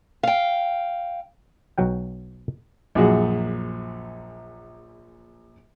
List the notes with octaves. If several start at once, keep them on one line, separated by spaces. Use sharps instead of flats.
F5 G5
B1 B2 F#3 F#5 G5
A#1 F#2 A#2 F#4 G#4